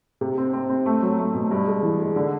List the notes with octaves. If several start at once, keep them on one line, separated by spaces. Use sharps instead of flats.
C3
C4
C4
C4
A3
F#3
A3
B2
G2
G#3
E3
G#3
D3